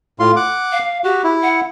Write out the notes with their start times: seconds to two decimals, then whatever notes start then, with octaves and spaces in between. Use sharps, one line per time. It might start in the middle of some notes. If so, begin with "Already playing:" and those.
0.20 A2 F4 C6
0.36 F#5 D6
0.72 F5
1.04 F#4 G4
1.24 E4
1.42 F#5